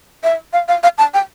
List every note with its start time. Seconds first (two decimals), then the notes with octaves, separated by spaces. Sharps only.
0.24 E5
0.53 F5
0.68 F5
0.83 F5
0.98 A5
1.14 G5